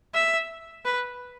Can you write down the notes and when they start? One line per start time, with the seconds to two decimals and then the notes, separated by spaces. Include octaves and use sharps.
0.14 E5
0.85 B4